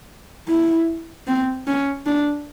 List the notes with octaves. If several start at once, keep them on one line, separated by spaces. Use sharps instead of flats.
E4
C4
C#4
D4